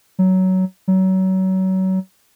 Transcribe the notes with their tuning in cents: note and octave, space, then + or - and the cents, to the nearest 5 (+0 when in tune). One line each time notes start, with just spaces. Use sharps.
F#3 +15
F#3 +30